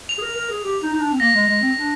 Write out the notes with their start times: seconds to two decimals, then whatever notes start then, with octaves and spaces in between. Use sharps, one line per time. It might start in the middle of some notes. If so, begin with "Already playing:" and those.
0.09 F7
0.18 G#4
0.22 A#4
0.36 A#4
0.50 G#4
0.64 G4
0.83 D#4
0.93 D#4
1.01 D4
1.12 C4
1.20 A#3 A#6
1.34 G#3
1.48 G#3
1.61 C4
1.76 D4